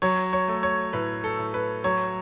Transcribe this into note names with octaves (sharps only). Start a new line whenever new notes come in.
F#3 C#5
C#5
A3
C#5
A2 B4
A4
A2
B4
F#3 C#5